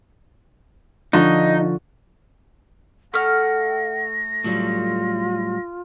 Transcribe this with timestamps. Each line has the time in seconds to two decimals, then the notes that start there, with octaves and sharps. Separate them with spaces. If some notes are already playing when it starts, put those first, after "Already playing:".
1.13 D3 F3 D#4 F4 C#6
3.14 A3 F#5 F6 A#6
4.44 A2 F#3 G3 F4